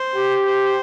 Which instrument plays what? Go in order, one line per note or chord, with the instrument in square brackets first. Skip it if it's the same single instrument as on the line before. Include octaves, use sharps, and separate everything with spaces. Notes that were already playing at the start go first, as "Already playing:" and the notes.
Already playing: [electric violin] C5
[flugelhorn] G4
[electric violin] C5